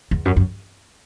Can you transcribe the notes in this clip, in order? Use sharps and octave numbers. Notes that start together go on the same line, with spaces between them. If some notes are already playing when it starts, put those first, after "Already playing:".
E2
F#2
F#2